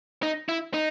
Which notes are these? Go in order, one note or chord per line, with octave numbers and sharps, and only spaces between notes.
D#4
E4
D#4